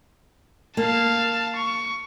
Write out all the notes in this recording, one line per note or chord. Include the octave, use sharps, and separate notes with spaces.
A#3 F5 A5
C#6